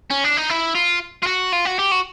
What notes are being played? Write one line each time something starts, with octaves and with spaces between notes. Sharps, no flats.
C#4
D4
D#4
E4
F4
F4
F#4
F4
F#4
G4
F#4